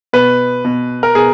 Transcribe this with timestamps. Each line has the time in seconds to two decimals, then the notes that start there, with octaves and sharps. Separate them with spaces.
0.13 B2 B4
0.65 B2
1.03 A#4
1.15 B2 G#4